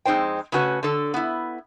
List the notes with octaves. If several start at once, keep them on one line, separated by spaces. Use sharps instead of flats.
F2 G#3 C4 D#4 C5 G5
C#3 A3 C#4 F#4 A#4 B4
D3 A4
B3 E4